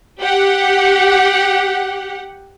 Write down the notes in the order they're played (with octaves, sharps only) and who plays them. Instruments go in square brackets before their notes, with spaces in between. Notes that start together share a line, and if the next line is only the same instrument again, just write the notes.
[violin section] G4 F#5